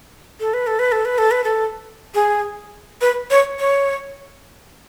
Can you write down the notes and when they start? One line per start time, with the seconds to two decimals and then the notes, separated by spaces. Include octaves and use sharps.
0.40 A4
0.54 B4
0.67 A4
0.79 B4
0.92 A4
1.05 B4
1.18 A4
1.31 B4
1.44 A4
2.15 G#4
3.01 B4
3.31 C#5
3.59 C#5